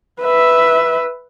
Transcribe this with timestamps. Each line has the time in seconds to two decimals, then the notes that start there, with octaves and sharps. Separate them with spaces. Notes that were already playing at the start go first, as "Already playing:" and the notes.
0.21 B4 E5